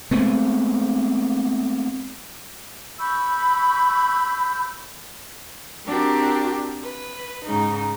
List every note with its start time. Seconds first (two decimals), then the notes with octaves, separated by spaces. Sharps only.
0.11 G#3 A3 B3 C4
2.99 B5 C#6 E6 G6
5.86 C4 D4 F#4 G4 A#4
6.83 B4
7.44 G#2 C#3 D#4